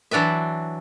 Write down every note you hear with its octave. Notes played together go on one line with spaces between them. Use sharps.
E3 F#3 D4 B4 E5